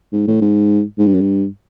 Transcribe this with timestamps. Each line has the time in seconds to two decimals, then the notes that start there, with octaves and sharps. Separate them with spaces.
0.13 G#2
0.27 A2
0.42 G#2
0.98 G#2
1.06 G2
1.14 F#2
1.21 G2